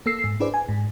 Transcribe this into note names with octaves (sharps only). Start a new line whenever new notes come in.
A#3 A4 E6 C7
G#2
D4 E4 G#4 B4 C5 D5
G#5
G#2